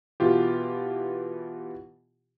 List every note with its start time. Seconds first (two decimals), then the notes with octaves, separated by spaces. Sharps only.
0.20 B2 E3 F4 G4